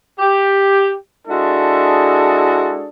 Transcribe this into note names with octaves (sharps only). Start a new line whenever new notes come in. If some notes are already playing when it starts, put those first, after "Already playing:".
G4
G#3 D4 E4 F#4 G#4 A4